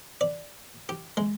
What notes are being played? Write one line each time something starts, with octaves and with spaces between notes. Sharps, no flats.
D5
G4
G#3